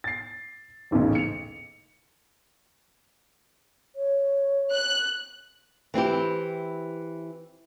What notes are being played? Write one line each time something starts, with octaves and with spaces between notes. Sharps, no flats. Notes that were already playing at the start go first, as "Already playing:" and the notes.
A6 C7
D#1 A1 G#2 C#3
C#7 F7
C#5
F#6
E3 C4 E4 G4